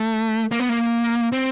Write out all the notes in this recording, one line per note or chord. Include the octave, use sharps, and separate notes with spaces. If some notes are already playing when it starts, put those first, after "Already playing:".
Already playing: A3
A#3
B3
A#3
C4